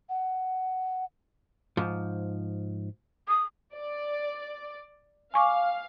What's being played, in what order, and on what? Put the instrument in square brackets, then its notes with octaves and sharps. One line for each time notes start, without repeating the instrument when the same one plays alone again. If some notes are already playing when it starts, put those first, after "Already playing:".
[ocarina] F#5
[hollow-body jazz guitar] G#2 F3
[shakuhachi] D#6
[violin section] D5
[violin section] F5 [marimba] G#5 C#6 D6